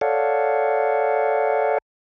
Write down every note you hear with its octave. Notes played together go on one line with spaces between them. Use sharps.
A4 C#5 D5 F5 F#5